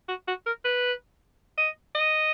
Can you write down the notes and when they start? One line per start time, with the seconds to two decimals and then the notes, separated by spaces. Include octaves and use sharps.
0.08 F#4
0.28 F#4
0.46 A#4
0.65 B4
1.58 D#5
1.95 D#5